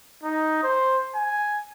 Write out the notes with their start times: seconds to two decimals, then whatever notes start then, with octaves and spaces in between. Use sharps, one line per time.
0.23 D#4
0.63 C5
1.15 G#5